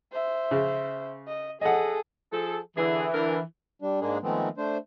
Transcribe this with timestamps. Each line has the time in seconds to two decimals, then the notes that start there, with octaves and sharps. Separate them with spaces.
0.12 C5 E5
0.51 C#3
1.27 D#5
1.61 G#4 A4 D#5 F#5
2.32 F3 G#4 A4
2.76 D3 E3 G#4
3.13 D3 A#4
3.82 G3 D4
4.01 G#2 G#3 A#3 D4 G#4
4.23 D#3 F3 G#3 A3 B3 C4
4.58 A3 D4 C5